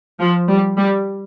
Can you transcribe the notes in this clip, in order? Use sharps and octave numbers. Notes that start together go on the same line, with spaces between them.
F3
G3
G3